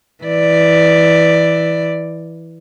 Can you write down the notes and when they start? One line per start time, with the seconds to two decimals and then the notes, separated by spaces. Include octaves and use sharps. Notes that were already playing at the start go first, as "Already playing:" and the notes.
0.24 E3 D5